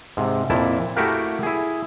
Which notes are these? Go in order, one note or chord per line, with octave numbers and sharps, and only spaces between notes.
G#2 C3
F2 A#2 E4 A5
A3 E4 F#4 G4 A#4 F5
E4 G#4